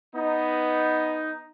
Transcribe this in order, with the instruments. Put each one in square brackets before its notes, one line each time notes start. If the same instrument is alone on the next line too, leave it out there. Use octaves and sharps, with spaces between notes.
[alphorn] B3 [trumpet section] D#4